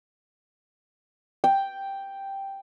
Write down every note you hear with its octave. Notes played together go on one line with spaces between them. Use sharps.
G5